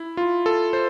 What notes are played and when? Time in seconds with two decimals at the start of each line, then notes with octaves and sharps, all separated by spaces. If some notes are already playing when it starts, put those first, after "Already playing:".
Already playing: E4
0.17 F4
0.46 A4
0.73 C5